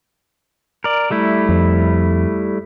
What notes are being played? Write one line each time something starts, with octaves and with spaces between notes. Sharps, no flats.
A#4 D5
G3 A3 E4
F2